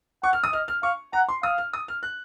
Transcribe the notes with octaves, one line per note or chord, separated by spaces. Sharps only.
F#5 C#6
F6
D#6
D#5 F6
F6
F5 C#6
F#5 A#5
C6
F5 D#6
F6
D#6
F6
F#6